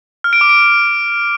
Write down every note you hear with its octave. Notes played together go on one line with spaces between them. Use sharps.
F6
D7
D6
D7